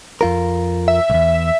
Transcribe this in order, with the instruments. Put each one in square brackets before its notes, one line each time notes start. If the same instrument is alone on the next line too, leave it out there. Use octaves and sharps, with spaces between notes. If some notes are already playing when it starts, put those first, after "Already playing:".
[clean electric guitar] F2 F4 A#4
[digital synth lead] E5
[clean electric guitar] B1 E2